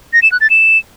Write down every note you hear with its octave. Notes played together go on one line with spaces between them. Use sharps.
A#6
E7
F#6
A6
E7